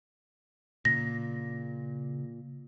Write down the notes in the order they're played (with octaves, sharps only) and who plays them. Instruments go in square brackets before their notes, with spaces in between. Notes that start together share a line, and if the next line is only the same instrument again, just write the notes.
[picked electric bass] A#2 [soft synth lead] C#3 [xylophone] A#6